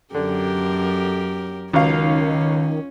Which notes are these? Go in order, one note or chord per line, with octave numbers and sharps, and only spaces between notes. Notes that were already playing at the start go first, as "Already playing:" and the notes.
F#2 D3 G4 A#4
C#2 D#3 F#3 C#4 F5